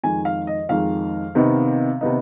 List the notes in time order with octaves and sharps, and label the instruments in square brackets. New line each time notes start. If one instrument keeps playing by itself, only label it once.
[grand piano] F2 D#3 G#3 G#5
F5
D#5
F2 D#3 G#3 F5
C3 D#3 B3 D#4
C3 D#3 B3 D#4